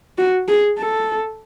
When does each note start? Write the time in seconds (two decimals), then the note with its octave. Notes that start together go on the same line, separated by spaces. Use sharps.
0.18 F#4
0.48 G#4
0.79 A4